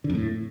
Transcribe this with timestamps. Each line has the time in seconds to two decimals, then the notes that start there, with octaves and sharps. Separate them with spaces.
0.04 D3
0.10 F2
0.15 A2